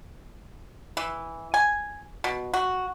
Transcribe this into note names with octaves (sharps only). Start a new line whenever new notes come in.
E3
G#5
B2
F#4